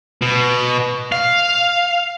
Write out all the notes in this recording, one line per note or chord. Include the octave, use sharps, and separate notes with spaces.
B2
F5